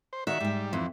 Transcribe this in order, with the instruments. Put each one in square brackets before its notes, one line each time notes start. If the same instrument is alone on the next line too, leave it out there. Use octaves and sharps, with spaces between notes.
[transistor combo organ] C5
[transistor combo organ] D#3 F#4 [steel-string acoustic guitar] E5
[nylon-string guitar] G#2 G5 [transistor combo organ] G3
[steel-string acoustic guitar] F2 [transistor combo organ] E3